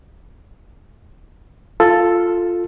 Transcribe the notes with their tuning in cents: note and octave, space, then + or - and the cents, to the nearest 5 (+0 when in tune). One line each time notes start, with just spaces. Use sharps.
F4 +0 A4 +5